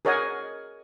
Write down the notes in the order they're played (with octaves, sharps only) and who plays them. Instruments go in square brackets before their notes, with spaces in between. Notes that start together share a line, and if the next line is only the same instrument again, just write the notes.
[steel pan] G#4 A#4 C#5 D#5 F#5 G#5